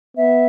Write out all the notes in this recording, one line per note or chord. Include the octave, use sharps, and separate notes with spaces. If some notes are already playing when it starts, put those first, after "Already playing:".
B3 E5